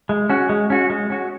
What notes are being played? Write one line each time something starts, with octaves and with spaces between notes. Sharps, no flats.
G#3
C#4 F#4
G#3
C#4 F#4
G#3
C#4 F#4